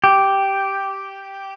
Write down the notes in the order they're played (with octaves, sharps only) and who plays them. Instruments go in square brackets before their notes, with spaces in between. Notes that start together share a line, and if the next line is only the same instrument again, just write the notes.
[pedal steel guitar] G4